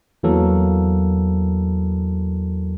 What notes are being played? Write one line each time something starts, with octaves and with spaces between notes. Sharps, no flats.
E2 E3 F#3 A#3 A4 A#4